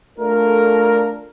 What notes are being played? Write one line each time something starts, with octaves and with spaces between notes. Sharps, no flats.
A3 D4 F4 A4 A#4